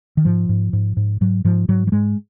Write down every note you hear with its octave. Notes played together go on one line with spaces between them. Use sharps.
D#3
G#2 F3
G#2
G#2
G#2
G#2 F#3
G#2 F3
G#2 F#3
F#3
G#2 G#3